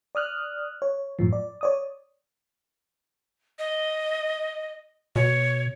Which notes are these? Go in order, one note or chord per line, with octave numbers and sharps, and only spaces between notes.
D5 D#6 F6 F#6
C#5
F#2 A2 F3
D5
C#5 D5 D#6
D#5
B2 C#5